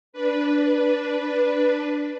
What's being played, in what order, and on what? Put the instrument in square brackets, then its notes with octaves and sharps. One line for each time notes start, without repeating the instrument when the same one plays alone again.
[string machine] D4 B4